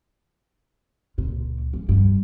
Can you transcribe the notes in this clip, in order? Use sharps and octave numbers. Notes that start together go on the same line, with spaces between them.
C#2 A#2
G#2
G2